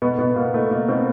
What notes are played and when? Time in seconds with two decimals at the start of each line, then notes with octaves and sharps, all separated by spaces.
0.02 B2 B3
0.19 B2 B3
0.36 B2 A#3
0.54 B2 A3
0.71 B2 A#3
0.88 B2 C4